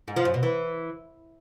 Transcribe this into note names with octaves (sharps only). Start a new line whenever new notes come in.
G#2
F3
F#2
B2
E3